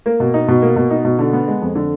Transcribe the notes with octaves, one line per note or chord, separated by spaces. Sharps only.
A#3
B2
D#4
B2
A#3
B2
D#4
B2
D3
B3
G#3
F2
D3